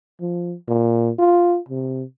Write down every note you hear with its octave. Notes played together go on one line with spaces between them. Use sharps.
F3
A#2
F4
C3